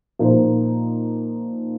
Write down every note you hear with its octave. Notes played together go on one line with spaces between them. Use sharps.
A#2 F3 A#3 D#4 C5